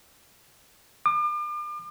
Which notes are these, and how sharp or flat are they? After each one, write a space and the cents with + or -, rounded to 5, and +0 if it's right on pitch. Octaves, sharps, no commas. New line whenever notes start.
D6 +40